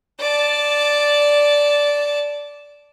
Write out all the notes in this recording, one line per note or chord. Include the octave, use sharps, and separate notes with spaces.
D5 A5